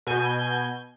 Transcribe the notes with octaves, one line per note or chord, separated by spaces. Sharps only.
B2 G#5 G6